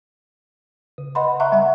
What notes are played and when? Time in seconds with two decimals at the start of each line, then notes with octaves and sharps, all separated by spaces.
0.98 C#3
1.15 B4 D#5 F#5 B5 C6
1.40 E5 F#5 A#5 C#6 F#6
1.52 G3 E5 F#5